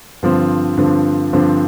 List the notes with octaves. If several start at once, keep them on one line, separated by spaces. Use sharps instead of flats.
G2 D3 F3 C4
G2 D3 F3 C4
G2 D3 F3 C4